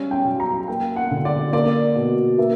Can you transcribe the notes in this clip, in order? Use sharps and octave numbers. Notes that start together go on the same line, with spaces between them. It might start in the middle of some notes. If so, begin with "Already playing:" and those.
Already playing: G3 C#4
G5
F#3
A#5
A#3 G5
F#5
D3
D5
A#3 D5
B2
A#3 E5